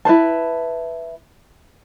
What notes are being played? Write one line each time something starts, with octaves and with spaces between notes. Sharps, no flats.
E4 B4 C5 A5